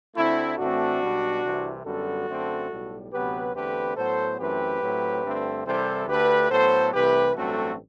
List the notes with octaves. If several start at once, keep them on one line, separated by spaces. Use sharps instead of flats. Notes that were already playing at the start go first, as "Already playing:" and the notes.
D2 D3 A3 C4 E4
A2 E3 A3 C4 D4 F#4
B1 B2 G3
C2 C3 E3
F#2 D3 G3 B3 F#4 A4
F#2 D3 A3 C4
B1 A2 G3
D2 C3 F#3 B3 G4 B4
E2 D3 A3 C4 G4 B4
A2 F#3 B3 A4 C5
F#2 E3 A3 C4 G4 B4
A2 F#3 A3 C4
G2 D3 A3 C4
C2 C3 E3 G3 C4 A4 C5
D2 D3 A3 G4 B4
A2 F#3 B3 A4 C5
C2 C3 E3 A3 G4 B4
A1 G2 F#3 A3 C4 F#4 A4